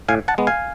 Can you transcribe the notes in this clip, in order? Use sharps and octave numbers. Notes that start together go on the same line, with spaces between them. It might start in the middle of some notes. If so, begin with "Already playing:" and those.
A2 F5 G#5
F#5 A5
G#3 B3
F5 G#5